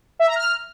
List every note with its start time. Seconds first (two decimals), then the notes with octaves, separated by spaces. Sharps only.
0.19 E5
0.28 A#5
0.36 F6